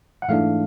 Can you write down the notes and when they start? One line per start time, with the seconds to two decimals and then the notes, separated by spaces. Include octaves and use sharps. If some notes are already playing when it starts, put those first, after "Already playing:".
0.22 F#5
0.28 G#2 E3 A3 D4 F5